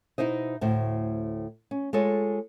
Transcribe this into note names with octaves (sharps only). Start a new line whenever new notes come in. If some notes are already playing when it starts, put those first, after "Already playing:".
B2 D#4 E4 C5 D#5
D2 A2 C5
C#4
G#3 F4 A4 C#5